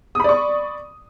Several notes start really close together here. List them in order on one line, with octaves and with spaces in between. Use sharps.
D#6 B5 D5 C#6